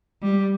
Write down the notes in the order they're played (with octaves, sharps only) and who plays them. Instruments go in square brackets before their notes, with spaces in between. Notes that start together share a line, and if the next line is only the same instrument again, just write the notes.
[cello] G3